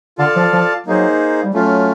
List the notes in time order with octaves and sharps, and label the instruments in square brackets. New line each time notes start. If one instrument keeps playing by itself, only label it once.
[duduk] D3 [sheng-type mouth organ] F4 A4 D5 F5 A5
[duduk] F3
F3
[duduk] F#3 [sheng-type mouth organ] A#3 D#4 G#4 C5
[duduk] G3
[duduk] F#3 [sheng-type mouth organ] A3 C#4 F4